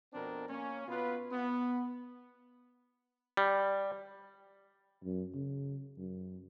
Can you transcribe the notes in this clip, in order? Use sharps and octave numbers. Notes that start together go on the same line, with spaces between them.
F2 B2 C4 D4 A#4
A#3 C#4
B2 B3 F4 B4
B3
G3
F#2
C#3
F#2